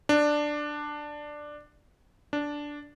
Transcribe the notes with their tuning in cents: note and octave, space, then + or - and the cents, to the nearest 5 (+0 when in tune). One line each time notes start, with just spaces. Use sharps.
D4 +10
D4 -5